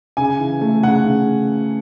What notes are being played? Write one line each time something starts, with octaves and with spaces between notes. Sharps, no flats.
C#3 G#5
E3
A3
C#3 F#5
C#3